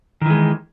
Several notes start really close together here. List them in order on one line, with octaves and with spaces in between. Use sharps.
D#3 E3 G#3